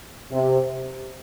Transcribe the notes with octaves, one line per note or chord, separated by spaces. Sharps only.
C3